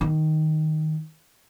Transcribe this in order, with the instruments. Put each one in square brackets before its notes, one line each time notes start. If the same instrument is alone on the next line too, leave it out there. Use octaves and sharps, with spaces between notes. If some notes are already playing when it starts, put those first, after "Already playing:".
[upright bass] D#3